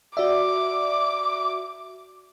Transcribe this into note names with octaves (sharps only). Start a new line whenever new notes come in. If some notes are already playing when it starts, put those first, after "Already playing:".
F#4 D5 E5 D6